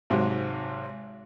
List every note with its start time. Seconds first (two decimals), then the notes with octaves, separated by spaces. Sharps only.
0.10 G#1 G#2 C3 F#3